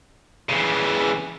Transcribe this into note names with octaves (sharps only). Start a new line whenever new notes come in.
C#3 E3